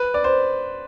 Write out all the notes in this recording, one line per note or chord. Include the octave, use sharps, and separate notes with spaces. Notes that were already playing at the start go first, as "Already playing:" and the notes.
Already playing: B4
D5
C5